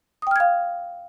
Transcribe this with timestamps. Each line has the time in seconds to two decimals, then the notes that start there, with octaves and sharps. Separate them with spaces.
0.22 D#6
0.27 G5
0.31 F6
0.36 G#6
0.40 F5